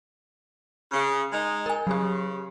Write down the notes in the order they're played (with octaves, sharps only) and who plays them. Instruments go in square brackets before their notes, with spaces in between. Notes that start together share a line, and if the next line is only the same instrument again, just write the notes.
[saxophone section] C#3
G#3 D#4
[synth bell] A#4 G#5
[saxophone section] C#3 [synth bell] F#3 G4